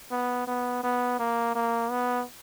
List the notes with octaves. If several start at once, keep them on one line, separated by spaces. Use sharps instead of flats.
B3
B3
B3
A#3
A#3
B3